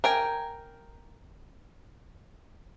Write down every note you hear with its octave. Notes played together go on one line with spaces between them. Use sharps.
A#4 G5 G#5